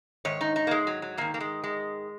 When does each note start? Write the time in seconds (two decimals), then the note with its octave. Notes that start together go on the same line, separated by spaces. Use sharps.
0.25 G#2 D#3 C#5
0.41 D#4
0.56 D#4
0.67 A#3
0.71 G#3
0.87 F#3
1.02 F#3
1.17 G#2 D#3 A#3
1.34 A#3
1.40 G#3
1.64 G#3